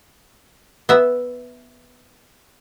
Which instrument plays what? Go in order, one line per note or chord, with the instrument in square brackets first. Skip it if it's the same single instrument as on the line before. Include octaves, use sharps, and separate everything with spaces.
[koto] B3 E5